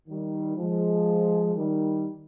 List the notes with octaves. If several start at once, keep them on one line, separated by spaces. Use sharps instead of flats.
D#3 G3
F3 G#3
D#3 G3